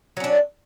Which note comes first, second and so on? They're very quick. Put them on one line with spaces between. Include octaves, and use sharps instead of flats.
F#3 C#4 D4